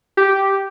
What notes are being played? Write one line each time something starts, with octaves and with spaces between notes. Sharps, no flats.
G4